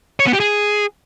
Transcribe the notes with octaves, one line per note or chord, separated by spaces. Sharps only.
C#5
B3
G4
G#4